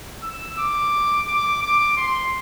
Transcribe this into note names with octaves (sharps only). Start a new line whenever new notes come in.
E6
D6
D6
D6
C6